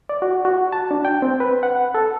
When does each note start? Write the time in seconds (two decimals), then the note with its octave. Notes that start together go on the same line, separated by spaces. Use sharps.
0.09 D5
0.22 F#4
0.45 F#4
0.73 A5
0.91 D4
1.05 G5
1.22 C4
1.40 B4
1.63 F#5
1.95 A4